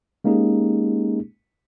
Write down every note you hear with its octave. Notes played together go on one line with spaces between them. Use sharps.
G#3 A#3 C#4 D#4 G4 G#4